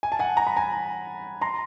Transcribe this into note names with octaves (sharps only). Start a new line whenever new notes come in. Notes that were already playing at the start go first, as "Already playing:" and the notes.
G#5
A5
F#5 G#5
A#5
B5
G#5 A#5
A#5 C6